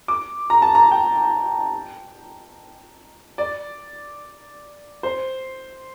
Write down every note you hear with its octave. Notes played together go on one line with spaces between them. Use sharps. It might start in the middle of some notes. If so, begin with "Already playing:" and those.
D6
A#5
A5
A#5
G5
D5
C5